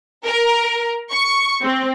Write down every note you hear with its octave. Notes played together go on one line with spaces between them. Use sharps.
A#4
C#6
C4